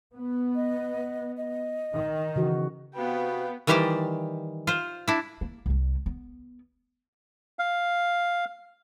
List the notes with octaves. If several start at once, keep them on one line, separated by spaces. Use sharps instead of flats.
B3
D#5
D#5
D#3
C#3 E3 F#4
C3 B3 F#4 B4 F5 G5 B5
D#3 E3 G3 G4 C5 D5
F4 C5
D4 E4
A#3
C2 G3
B3
F5